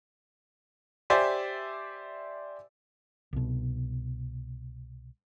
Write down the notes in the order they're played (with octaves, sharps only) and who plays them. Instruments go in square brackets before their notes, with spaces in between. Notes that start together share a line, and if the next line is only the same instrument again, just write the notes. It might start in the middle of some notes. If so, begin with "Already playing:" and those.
[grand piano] G4 C5 D5 E5 G#5
[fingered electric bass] C2 B2